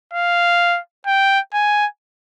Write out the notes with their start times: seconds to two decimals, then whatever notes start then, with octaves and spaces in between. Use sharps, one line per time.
0.13 F5
1.07 G5
1.53 G#5